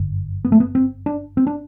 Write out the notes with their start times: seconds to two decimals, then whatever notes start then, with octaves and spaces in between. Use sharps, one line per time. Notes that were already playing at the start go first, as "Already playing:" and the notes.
Already playing: G1 F#2 D3
0.45 B3
0.52 A3
0.60 B3
0.75 C4
1.06 D4
1.37 C4
1.47 D4